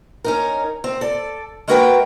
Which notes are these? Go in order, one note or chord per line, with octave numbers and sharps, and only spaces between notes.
C#4 D#4 A#4
C4
A4 D5
G#3 A#3 F#4 A#4 B4 G5